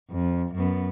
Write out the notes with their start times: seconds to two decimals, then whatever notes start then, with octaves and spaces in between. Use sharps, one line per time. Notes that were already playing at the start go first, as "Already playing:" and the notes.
0.11 F2
0.55 F#2 B3